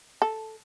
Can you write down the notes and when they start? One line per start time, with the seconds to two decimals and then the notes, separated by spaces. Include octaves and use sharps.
0.22 A4